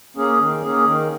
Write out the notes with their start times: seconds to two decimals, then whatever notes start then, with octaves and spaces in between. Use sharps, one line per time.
0.17 A#3 C#4 G#4
0.39 D#3
0.62 A#3 C#4 G#4
0.85 D#3